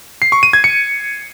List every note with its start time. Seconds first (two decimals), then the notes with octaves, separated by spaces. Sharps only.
0.22 C7
0.32 C#6
0.43 D#7
0.53 G#6
0.64 C#7